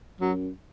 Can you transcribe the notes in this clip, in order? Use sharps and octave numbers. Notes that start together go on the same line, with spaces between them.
F#2 F#3